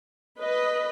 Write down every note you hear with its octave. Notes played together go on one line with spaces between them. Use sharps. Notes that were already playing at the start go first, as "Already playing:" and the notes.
B4 D#5